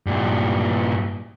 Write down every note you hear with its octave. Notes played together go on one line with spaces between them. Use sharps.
G2 A#2